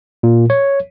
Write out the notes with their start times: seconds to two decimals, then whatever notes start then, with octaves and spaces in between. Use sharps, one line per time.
0.23 A#2
0.50 C#5